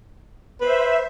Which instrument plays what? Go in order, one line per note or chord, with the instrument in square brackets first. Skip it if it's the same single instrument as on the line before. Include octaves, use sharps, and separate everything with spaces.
[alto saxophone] B4 [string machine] C5 E5